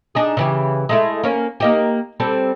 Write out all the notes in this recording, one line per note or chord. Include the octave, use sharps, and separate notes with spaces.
D4 D#4 G#4
C#3 E3 G4
G#3 A3 E4
A#3 C#4
A#3 D#4 G4
G3 C4 A4